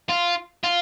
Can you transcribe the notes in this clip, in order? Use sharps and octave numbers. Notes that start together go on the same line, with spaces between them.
F4
F4